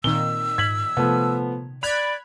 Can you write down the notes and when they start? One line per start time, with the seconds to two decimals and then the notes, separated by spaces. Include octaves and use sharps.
0.04 A#2 D#3 C4 E6 G7
0.58 G#2 G#6 B6 F#7
0.97 C3 F3 A3 B3
1.83 D5 B5 F#6 G#6 F7